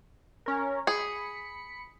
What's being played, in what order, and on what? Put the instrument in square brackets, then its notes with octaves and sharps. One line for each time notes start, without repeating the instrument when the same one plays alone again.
[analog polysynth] C#4 A#4
[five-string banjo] G#4 [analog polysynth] B5 C#7